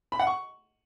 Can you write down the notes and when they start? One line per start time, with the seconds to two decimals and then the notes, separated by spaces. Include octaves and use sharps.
0.12 B5
0.19 F#5
0.27 C#6